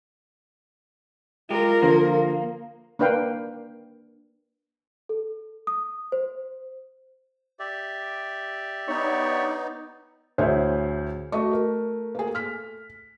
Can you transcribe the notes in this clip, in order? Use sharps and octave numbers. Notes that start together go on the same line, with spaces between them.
G#3 F4 G4 A#4
D3 F3 A#3
A#3 D4 B4 F5 G5
A4
D#6
C5
G4 D5 E5
B3 D4 D#4 C#5
D2 A2 G#4 C5 C#5 E5
A3 F#4 D#5 C#6
A#4
A#3 G#4
F6 B6